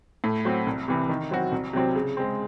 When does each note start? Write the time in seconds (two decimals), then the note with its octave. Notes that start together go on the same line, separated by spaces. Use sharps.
0.24 A2
0.45 F#3 C4 F#4
0.67 C2
0.88 C3 E3
1.09 D#3
1.31 F#3 C4 F#4
1.52 C2
1.73 C3 F#3 C4
1.95 C#3
2.17 G#3 C4